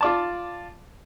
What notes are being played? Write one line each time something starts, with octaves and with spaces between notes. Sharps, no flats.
F4 D5 A5